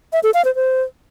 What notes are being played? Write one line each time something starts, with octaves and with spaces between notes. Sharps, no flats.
E5
A4
F5
C5
C5